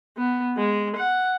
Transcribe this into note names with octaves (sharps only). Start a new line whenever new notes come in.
B3
G#3
F#5